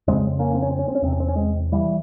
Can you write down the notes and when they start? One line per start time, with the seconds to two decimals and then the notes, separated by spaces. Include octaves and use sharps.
0.07 F2 C#3 G#3 C4
0.39 A#3 C#4
0.54 C4
0.62 C#4
0.71 C4
0.79 C#4
0.88 C4
0.95 C#4
1.02 E2 C3 C4
1.12 C#4
1.20 C4
1.28 C#4
1.36 G#3 C4
1.72 E3 G3